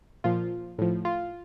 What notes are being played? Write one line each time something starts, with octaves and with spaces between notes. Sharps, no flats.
A#2 F3 F4
A2 F3
F4